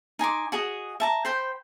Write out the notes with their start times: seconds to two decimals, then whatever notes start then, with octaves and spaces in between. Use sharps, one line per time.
0.19 D#4 G#5 C6 D6
0.52 F#4 G#4 D#5
1.00 E5 A5 A#5
1.25 C5 G5 B5